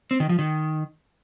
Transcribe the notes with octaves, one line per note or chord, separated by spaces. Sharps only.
C4
D#3
F3
D#3